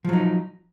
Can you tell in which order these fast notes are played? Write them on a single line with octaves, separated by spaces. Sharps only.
F3 F#3 D#4